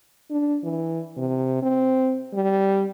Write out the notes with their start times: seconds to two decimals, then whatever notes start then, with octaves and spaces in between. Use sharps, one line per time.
0.30 D4
0.64 E3
1.17 C3
1.62 C4
2.34 G3